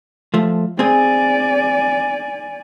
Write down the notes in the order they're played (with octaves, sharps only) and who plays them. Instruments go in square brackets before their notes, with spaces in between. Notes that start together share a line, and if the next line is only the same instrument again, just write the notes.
[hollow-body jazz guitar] F3 A3
[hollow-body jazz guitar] C4 G#4 [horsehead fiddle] D5 G#5